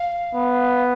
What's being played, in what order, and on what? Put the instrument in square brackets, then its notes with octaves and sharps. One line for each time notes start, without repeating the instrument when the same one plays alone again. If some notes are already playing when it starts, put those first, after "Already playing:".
Already playing: [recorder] F5
[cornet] B3